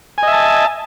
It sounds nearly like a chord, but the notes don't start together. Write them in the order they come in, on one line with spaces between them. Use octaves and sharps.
G#5 D#5 E5 A5